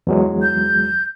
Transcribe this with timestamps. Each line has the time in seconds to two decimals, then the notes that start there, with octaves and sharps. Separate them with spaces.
0.07 E2 F#3 G#3
0.42 G6